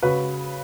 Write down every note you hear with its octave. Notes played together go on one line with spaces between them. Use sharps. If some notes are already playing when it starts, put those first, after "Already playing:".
C#3 F#4 B4